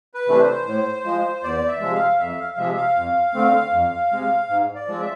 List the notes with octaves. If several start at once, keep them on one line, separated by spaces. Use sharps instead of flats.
B4
C3 E3 A3 D4
C5
A2
F3 G#3
E2 D5
E5
C3 F3 G#3
F5
F2 E5
F5
C3 F3 G#3 E5
F5
F2
D3 A3 C4
F2
C3 G#3
G#2
D5
F3 G#3 C4
E5